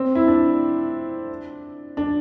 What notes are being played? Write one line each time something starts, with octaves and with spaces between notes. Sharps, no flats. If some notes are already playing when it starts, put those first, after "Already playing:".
Already playing: C4
E4
D4
D4